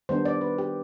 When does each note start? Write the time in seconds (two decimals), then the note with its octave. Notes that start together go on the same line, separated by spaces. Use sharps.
0.09 D#3 G3 B3 D4 C5
0.25 D5
0.41 B4
0.58 G4